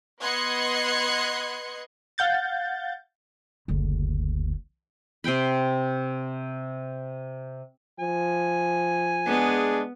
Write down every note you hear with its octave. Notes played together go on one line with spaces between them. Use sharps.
B3 D#5 C6 F#6 G#6 C#7
F5 F#5 G6 A6
F#1 D2
C3 C5 G5 B5
F3 G#5
G#3 B3 D4 G#4